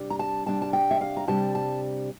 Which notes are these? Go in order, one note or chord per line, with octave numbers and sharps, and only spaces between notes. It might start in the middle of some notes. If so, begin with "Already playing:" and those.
Already playing: C3 G3 D4
A#5
A5
C3 G3 D4 A5
A5
G5
E5
F5
A#5
C3 G3 D4 A5
A5